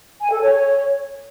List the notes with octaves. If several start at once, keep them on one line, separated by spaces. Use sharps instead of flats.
G#5
A4
C#5